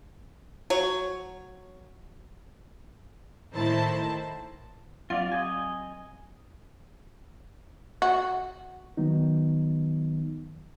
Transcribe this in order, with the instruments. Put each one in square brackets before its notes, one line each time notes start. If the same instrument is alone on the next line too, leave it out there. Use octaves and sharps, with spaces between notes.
[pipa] F#3 C#5
[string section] A2 D#3 E4 C5 A5
[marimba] F#3 C4 [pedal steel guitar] F4 D5 F5
[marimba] G4 [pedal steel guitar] D#5 G#5
[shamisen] F#4
[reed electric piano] D#3 F#3 B3 D#4